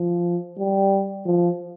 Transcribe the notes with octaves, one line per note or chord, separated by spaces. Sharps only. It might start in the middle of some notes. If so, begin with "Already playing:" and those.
Already playing: F3
G3
F3